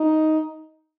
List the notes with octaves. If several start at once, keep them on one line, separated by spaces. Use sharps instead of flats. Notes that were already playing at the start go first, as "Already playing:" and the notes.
Already playing: D#4